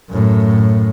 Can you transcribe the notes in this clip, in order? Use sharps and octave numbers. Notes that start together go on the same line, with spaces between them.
F#2 A2